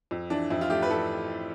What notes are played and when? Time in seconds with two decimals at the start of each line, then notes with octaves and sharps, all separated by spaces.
0.11 F2
0.30 E3 D4
0.50 F2 E4
0.61 F4
0.70 A3 G4
0.82 B4
0.89 E3 A4